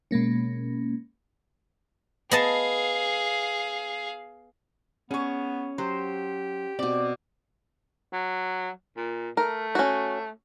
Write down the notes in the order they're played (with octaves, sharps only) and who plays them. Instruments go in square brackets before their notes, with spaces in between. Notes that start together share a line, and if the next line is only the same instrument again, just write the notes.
[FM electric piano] B2 G#3 A#3 C#4
[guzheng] B3 D#5 A5 [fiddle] G#4 F5
[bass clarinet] B3 [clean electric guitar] C#4 [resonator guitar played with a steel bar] G#4 C#5
[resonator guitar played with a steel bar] F#3 [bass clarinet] G4 [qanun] C5
[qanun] B2 D6 [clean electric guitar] C4 [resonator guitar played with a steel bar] D5
[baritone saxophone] F#3
A#2
[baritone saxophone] A3 [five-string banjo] A#4
[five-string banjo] C#4 F#4